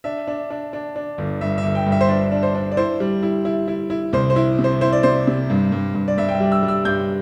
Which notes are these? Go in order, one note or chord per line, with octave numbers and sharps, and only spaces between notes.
D4 E5
D4
D4
D4
D4
G1
G2 E5
E5
G1
G5
G2
E5
C5
D4 D5
D4
C5
D4
D5
E4 C5
G3
E4
E4
E4
E4
C2 C5
C5
E4
C3
C5
E4 C5
D5
C3 C5
C3
G2
G2
G2
D5
G2 E5
G5
E5
G3
E6
G3
E6
G2 G6